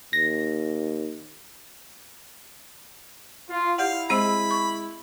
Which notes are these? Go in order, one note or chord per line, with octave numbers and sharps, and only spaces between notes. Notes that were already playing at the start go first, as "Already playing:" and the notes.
D#2 A#6
F4
E4 G4 D5 F5 F#5
G#3 C4 C5 B5 E6
C#6